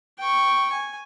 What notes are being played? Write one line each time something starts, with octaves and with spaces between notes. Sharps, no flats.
G5 C#6
G#5